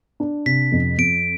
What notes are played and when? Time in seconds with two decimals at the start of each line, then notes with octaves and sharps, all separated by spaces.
0.20 D4
0.46 C3 B6
0.72 F2
0.98 F2 D7